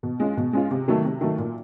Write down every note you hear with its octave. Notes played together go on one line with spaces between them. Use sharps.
B2
G#3 C#4 F4
B2
G#3 C#4 F4
C3
D#3 F#3 A3
C3
D#3 F#3 A3
A#2